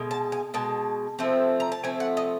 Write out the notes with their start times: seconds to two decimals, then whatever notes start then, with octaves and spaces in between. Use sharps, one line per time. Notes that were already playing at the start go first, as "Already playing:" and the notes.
Already playing: B2 G#3
0.11 A5
0.32 G#5
0.54 B2 G#3 A5
1.19 F3 A3 C4
1.60 A#5
1.72 A5
1.84 F3 A3 C4 G#5
2.00 F#5
2.17 D#5